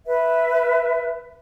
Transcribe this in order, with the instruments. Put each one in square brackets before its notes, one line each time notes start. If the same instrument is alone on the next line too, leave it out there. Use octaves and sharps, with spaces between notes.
[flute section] B4 E5